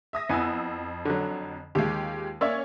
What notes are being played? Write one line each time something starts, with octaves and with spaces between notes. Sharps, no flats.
E5 D#6 A#6
F2 B3 E4 G#5 E6
D3 F#3
D#2 G#3 F4 G4
A#3 C#4 C#5 D5 E5